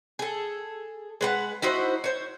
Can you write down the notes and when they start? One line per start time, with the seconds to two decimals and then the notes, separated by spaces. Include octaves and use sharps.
0.19 G#4 A4
1.21 G#3 B4 F#5
1.62 D#4 E4 F#4 C5
2.04 C5 C#5